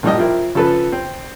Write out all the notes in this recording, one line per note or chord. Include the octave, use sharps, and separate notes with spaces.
A#1 A2 G3 G4 D#5
F3 C4 E4 A#4
C#3 F3 A4 B4
C4